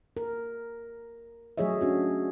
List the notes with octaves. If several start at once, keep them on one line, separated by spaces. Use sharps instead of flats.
A#4
F#3 A3 G#4 C#5 D#5 E5
C#4 D4 F#4